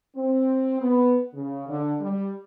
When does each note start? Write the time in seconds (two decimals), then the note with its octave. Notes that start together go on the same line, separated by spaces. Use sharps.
0.16 C4
0.80 B3
1.34 C#3
1.68 D3
2.00 G3